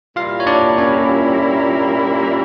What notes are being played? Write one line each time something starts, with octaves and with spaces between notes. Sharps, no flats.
A#2 G3 A#3 E4 F4 F5
C#5
D4 D5
C#4 C#5